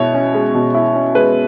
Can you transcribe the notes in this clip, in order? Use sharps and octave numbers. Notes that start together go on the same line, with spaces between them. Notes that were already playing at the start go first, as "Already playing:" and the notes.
Already playing: B2 G#3 E4 C#5
C#4
G#3
B2
E4
C#4
G#3 B4